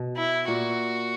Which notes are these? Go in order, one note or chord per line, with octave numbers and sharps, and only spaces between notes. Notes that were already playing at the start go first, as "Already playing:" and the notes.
Already playing: B2
E4
A#2 F#4